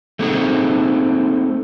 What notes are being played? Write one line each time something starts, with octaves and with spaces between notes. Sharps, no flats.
A3 A#3 C4 D#4 G#4